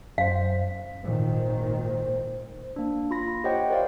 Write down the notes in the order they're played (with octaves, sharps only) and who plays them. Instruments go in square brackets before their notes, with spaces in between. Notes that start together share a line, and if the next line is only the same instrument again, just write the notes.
[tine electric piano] F#2 C5 [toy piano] F5
[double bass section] G#1 A#2 D#3 [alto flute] C5
[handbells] A#3 D4
F4 B5 A#6
G4 C5 C#5 D#5 F#5 G5
A#4 C5 D5 F5